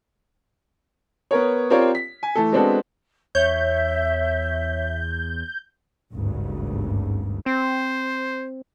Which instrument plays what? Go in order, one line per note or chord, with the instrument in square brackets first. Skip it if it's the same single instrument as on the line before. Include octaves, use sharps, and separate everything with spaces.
[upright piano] B3 A#4 C#5
C4 F4 G4 A#4 C#5 D5
B6
G#5
E3 A3 A4
G#3 B3 C4 D4 F#4 A4
[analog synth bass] E2 [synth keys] C#5 [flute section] E5 [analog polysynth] G6
[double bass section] G#1 D2 G2 C#3
[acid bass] C4 [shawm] C5